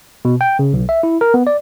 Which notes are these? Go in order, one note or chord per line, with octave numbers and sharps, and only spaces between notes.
B2
G5
C#3
B1
E5
E4
A#4
B3
D5